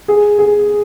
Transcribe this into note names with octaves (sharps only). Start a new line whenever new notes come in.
G#4
G#4